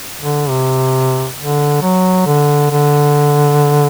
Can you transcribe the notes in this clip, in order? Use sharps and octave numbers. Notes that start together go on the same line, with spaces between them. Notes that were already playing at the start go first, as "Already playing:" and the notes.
D3
C3
D3
F#3
D3
D3